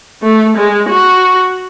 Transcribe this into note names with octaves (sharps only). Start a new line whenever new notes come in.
A3
G#3
F#4